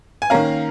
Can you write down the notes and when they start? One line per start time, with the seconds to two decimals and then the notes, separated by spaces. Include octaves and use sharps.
0.22 G#5
0.30 D#3 A#3 C#4 F5 A#5